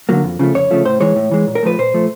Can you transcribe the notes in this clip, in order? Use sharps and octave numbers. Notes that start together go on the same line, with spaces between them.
D3 F#3 A#3
F2
C#3 F3 A3
F2 C#5
C#3 F3 A3
A2 C5
E3 G#3 C#5
A2
E3 G#3
A#2
A#4
F3 A3 B4
A#2 C5
F3 A3